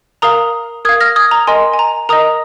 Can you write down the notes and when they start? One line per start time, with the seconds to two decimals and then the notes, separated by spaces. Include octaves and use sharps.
0.22 A#4 F5 A#5 D#6
0.85 A#4 F5 D#6 G#6
1.01 F6 A#6
1.16 D#6 G#6
1.31 A#5
1.47 A#4 D#5 G#5 C6
1.74 G#5
1.79 A#5
2.09 A#4 D#5 A#5 D#6